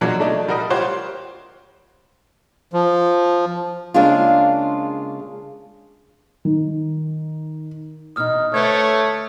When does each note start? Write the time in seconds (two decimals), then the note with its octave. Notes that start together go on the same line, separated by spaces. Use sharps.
0.01 B2 F3 F#3 G#3 A#3 D4
0.20 A3 D4 D#4
0.48 G3 F#4 A#4 D#5
0.70 F4 G4 C5 C#5 F#5
2.73 F3
3.94 C#3 G#3 A#3 D4 F4
6.45 D#3
8.16 E2 B2 D#4 D#6 F6
8.54 D2 A3 B4 C#5 F#5 G#6